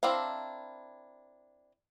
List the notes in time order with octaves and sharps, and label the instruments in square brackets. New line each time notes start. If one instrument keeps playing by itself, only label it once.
[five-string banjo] C4 D4 E4 A#4 F5